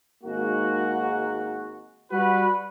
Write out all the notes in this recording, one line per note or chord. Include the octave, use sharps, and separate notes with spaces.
G#1 G#2 A#3 F#4
G3 F#4 B4